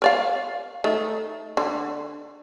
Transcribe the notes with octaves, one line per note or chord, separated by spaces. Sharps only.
A#4 D5 F5
D#3 A3
D3